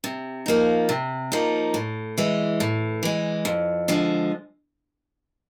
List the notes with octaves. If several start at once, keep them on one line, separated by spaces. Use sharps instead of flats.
C3
F3 A#3 D#4
C3
F3 A#3 D#4
A2
E3 G#3
A2
E3 G#3
F2
D3 F3 G#3